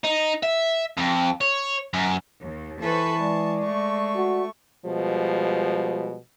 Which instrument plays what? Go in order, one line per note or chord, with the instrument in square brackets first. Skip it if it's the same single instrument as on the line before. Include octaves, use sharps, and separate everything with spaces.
[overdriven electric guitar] D#4
E5
F2
C#5
F#2
[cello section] D#2
[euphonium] E3 [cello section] A4 B4 C5 [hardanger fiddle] A5 C#6
[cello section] G#3 [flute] D5
[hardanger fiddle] A3 C#6
[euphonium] F#4
[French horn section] B2 F3 G3 G#3